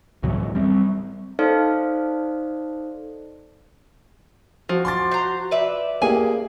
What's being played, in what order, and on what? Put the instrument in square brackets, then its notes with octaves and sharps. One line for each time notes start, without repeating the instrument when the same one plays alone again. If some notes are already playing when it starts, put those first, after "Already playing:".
[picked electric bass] C#2 A2 E3 F#3
G3 C4
[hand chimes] D#4 A4 C5 D5 F5
[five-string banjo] F3 [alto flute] F#4
[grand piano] C6 D6 A6
[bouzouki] C5 A#5
B4 D5 E5
[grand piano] A#3 G#4 [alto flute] G4 [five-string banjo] G#5